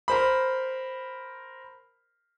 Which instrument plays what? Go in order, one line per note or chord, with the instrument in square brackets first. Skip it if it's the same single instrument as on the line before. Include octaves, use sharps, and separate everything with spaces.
[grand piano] A#4 C5 B5